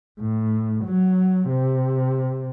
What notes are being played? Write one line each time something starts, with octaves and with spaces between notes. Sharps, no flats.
A2
F#3
C3